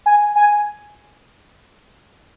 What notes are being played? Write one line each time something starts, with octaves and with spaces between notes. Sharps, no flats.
G#5
G#5